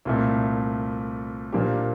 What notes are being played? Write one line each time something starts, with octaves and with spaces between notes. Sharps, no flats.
C2 A#2 A3
A#2 F3 A#3 D4 G4